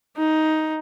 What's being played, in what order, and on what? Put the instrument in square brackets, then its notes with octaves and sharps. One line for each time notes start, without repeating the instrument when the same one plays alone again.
[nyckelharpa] D#4